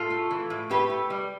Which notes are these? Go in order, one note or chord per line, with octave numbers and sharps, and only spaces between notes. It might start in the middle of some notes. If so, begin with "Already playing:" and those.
Already playing: A2 F4 A4
A3
E3
A2
A2 G4 B4
A3
G3